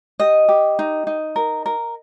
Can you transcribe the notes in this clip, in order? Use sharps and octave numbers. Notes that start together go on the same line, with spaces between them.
G4 D#5
G4
D#4
D#4
A#4
A#4